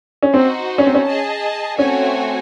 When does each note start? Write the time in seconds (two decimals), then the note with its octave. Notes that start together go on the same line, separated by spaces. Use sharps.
0.23 C#4
0.33 C4 D#4 F#4 C5
0.78 C#4
0.87 C4
0.94 C#4
1.06 G#4 D#5 A5
1.78 A3 C4 C#4 F#4 C#5 G#5